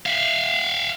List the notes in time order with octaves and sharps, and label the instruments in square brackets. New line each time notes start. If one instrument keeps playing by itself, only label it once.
[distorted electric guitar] E5 F5